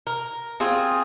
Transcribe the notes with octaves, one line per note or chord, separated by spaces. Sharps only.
A#4
C4 F4 G#4